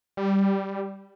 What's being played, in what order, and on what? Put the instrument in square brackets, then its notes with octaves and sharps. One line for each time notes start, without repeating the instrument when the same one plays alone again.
[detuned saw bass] G3